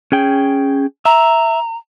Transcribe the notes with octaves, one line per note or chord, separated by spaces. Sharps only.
C#4 G#4 G5
E5 A#5